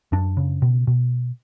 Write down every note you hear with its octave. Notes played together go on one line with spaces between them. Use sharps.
F#2 D4
C#3
B2
B2